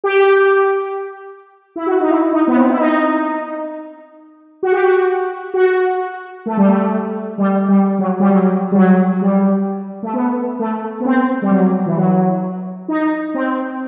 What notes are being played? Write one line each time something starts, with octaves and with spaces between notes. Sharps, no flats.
G4
E4
F#4
D#4
E4
D#4
B3
C4
E4
D#4
F#4
G4
F#4
F#4
A3
G3
A3
G3
G3
F#3
G3
F#3
G3
F#3
G3
A3
B3
A3
B3
C4
G3
F#3
E3
F#3
D#4
C4